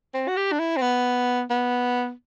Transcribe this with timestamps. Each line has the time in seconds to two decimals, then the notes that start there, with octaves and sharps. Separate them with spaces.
0.14 C4
0.28 F#4
0.37 G4
0.52 D4
0.60 E4
0.77 C4
0.81 B3
1.50 B3